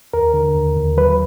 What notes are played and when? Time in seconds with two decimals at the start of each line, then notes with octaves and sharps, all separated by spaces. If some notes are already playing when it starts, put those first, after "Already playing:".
0.14 D#2 A#4
0.34 D3
0.55 D#2
0.77 D#2
0.97 F#3 B4